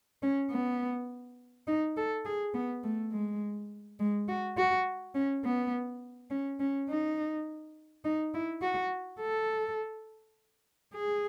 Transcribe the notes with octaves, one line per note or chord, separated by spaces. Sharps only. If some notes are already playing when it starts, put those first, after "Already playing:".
C#4
B3
D#4
A4
G#4
B3
A3
G#3
G#3
F#4
F#4
C#4
B3
C#4
C#4
D#4
D#4
E4
F#4
A4
G#4